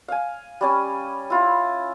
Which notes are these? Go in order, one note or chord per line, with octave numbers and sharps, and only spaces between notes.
F5 G#5
G3 C#4 G#5
E4 F4